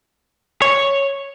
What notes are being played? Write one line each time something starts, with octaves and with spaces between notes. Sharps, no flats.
C#5